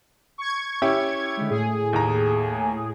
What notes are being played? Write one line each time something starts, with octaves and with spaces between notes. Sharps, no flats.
C#6 G#6
C#4 E4 G4
D3 G#3
A2 G#4
D#2 A#5